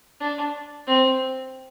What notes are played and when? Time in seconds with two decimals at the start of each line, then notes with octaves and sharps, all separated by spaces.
0.21 D4
0.87 C4